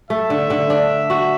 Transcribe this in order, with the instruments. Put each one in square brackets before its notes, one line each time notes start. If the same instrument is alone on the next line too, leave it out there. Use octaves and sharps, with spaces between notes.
[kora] A3 [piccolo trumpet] E5
[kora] D3
D3
D4
F#4